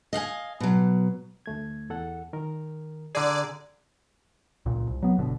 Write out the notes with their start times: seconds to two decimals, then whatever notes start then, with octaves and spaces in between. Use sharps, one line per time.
0.13 D#5 F5 F#5 G#5
0.60 B2 F#3
1.46 D2 A3 G#6
1.90 E2 A4 F#5
2.33 D#3 A#4
3.15 D3 G#4 D5 A#5 G#6
4.66 C#2 A#2
4.87 C2
5.03 F#3 B3
5.19 G1 B2 D3